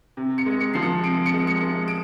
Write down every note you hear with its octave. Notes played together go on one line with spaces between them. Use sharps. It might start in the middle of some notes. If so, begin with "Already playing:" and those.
C3
C#7
G#3
C#7
F3 C7
C#7
C3 D7
C#7
G#3
C#7
G#3
D7